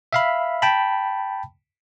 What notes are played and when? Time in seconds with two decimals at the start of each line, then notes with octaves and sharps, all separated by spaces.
0.13 E5 F5 B5
0.62 G5 A5 B5